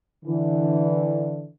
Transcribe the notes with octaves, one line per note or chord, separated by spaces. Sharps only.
D3 E3